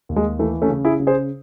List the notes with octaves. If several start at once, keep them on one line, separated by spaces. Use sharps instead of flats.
D#2
G#3
E3 A3
A3 C#4
C#3
E4 G#4
C#3
G#4 C5